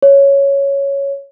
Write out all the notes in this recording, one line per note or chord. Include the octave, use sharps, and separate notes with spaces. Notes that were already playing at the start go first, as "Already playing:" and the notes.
C#5